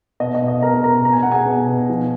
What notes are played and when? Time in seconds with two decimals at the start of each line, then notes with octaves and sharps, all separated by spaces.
0.20 B2 D#5
0.35 D#5
0.42 B2
0.48 D#5
0.62 B2 A#4 A#5
0.83 B2 A#4 A#5
1.05 B2 A#5
1.13 G#5
1.23 B2 F#5
1.32 G#4 G#5
1.46 B2
1.68 B2
1.89 F3